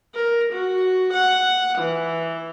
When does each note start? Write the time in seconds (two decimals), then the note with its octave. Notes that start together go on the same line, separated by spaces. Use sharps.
0.15 A#4
0.52 F#4
1.14 F#5
1.78 E3